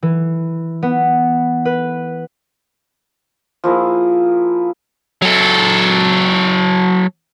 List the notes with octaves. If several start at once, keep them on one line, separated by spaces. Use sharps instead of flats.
E3
B3
B4
F3 A#3 E4 G#4
F#3 A4